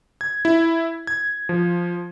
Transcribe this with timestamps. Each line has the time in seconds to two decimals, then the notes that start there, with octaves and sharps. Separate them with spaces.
0.21 G#6
0.45 E4
1.07 G#6
1.49 F3